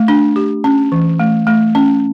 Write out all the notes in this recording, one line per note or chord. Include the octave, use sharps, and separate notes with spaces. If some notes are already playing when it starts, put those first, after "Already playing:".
Already playing: A3
D4
G4
C#4
E3
A3
A3
C#4